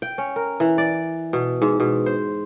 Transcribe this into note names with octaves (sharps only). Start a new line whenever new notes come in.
G5
C#4
A#4
E3
D5
B2
G#2
B2
C5